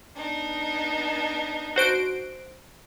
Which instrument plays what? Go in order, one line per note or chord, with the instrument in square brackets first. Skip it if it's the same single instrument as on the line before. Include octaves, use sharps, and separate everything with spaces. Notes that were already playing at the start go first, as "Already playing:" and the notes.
[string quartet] B3 D4 D#4
[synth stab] F#4 C5 D7